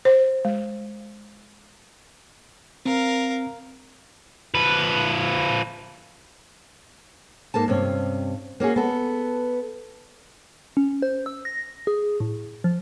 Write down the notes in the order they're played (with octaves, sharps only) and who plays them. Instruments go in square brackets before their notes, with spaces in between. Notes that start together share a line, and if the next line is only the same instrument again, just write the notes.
[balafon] C5
G#3
[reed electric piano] C4 [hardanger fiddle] A#4 F5
[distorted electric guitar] F3 B4
[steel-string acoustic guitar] G#2 A#3 A4 A5
G2 C3 C#4
A#3 C#4 F#4 G#4
B3 A4
[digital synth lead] C#4
C5
E6
A#6
G#4
A2
F3